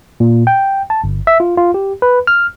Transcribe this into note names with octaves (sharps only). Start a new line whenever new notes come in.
A#2
G5
A5
G1
E5
F4
F4
G4
B4
F6